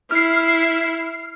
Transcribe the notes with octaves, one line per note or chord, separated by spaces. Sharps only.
E4 F6 C7